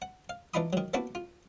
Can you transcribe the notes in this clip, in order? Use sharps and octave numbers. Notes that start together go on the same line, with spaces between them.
F#5
F5
E3 D4 D#4 F4 B5 D#6
D#3 F#3
A#3 B3 D4 E4 F#4 B4
F4